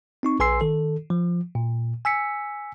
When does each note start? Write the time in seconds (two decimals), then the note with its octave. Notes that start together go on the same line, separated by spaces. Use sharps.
0.23 C4 D#4 C#6
0.40 A#1 B4 G#5 C6 E6 C7
0.61 D#3 A4
1.10 F3
1.55 A#2
2.05 G#5 E6 B6 C#7